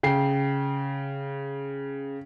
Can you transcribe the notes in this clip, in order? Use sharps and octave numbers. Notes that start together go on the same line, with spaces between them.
C#3 G5 C7